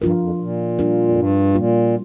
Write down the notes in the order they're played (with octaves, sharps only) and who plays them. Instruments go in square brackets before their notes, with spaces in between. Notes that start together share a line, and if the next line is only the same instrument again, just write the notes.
[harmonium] G2 [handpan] F3 D4 F4 A#4
[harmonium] F2
A#2
[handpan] G3 D4 F4 A#4
[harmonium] F2
G2
[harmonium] A#2 [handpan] G3 A#3 F4